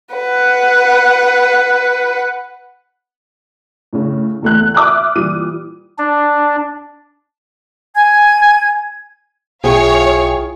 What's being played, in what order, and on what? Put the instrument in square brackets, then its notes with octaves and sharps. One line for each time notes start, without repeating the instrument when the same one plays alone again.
[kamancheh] B4 F#5
[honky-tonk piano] A2 C#3
E2 A3 F#6
E5 D6 D#6 F6 F#6
A#2 E3 G3 D#7
[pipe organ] D4
[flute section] G#5 G#6
[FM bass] B1 [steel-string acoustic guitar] E4 F4 [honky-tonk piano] G#4 G5 [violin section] C#5 F5